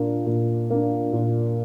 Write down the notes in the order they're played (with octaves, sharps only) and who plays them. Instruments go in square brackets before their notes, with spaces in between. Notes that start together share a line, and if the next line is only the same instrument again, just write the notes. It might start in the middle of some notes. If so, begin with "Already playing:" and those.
Already playing: [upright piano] A#2 A#3 D4
A#2
A#3 D4
A#2